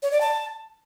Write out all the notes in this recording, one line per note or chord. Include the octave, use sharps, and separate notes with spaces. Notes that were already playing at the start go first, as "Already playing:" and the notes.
C#5
D5
A5